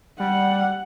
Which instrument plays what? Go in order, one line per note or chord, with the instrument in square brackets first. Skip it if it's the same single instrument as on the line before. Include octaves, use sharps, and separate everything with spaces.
[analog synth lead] G3 [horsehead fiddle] F#5